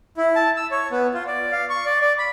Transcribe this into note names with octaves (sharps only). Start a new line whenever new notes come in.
E4
A5
E6
C#5
B3
F4
D5
F5
C#6
D5
D5
B5